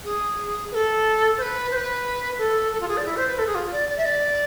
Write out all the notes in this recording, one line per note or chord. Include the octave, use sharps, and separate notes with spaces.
G#4
B4
A4
C5
B4
C5
B4
A4
A4
F4
G#4
D5
E4
C5
B4
A4
G#4
F4
D5
D5
E5
D5